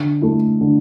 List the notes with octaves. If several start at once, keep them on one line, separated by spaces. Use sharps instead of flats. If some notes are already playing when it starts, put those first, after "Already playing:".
Already playing: D3
A3 E4
D3